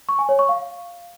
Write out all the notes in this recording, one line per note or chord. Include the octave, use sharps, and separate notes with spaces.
C#6
G#5
C#5
C#6
F5